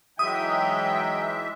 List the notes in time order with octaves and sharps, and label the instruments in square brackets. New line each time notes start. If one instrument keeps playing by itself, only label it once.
[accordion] E3 G#3 E5 [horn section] F#3 D#4 G5 [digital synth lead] D#6